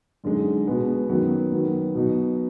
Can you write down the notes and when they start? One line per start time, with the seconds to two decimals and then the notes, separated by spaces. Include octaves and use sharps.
0.24 F#2 D3 G#3 D#4
0.67 B2 G#3 B3
1.09 F#2 D#3 F#3 B3
1.52 D#3 F#3 B3
1.95 B2 F#3 B3 D#4